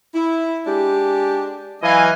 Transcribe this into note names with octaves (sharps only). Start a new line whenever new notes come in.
E4
G#3 D4 G4
E3 F#3 D#5 F5 G#5